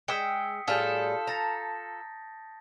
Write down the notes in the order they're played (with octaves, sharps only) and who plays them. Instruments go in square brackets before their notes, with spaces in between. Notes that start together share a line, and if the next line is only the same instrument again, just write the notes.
[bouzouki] G#3 [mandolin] G5 E6 [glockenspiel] D#6 B6 C#7
[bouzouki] A2 G3 G#4 [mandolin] F4 A4 [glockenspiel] G6 B6
[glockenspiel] A5 A6 A#6 [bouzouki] A#5